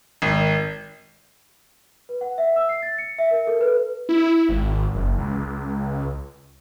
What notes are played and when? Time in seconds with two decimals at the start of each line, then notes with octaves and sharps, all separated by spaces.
0.22 G#1
2.09 B4
2.21 F#5
2.38 E5
2.56 E6
2.69 C7
2.82 A6
2.98 C#7
3.19 E5
3.31 A#4
3.47 A4
3.61 B4
4.09 E4
4.49 G#1
4.95 F#1
5.18 C#2